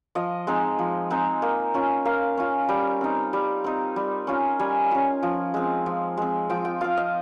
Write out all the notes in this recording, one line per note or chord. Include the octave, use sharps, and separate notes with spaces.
F3 D#5
G#3 C4 D#4
F3
G#3 C4 D#4
A#3
C#4 F4
A#3 F5
C#4 F4
G3 G5
C4 D#4
G3
C4 D#4
G3
C#4 F4
G3 G#5
C#4 F4
F3
G#3 C4
F3
G#3 C4
F3 G5
G5
C4 F4 F5
D#5